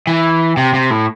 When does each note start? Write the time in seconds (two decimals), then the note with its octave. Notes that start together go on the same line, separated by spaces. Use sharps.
0.07 E3
0.57 C3
0.74 C3
0.90 A2